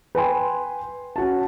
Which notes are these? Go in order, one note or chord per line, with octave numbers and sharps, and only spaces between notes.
B4 G5 G#5 C6
C#4 F#4 A5